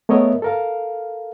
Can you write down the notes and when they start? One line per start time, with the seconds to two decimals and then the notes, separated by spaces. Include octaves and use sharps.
0.09 A3 B3 A#4 C#5 D#5 E5
0.42 A4 A#4 F5